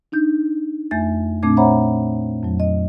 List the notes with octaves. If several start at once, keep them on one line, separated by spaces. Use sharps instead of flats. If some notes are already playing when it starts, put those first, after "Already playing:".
D4 D#4 G6
F2 A3 E5 G#5 G6 A6
A#2 A3 C4 D4 D6 G#6
C5 C#5 E5 F#5 A#5 B5
F2 F#3
D#5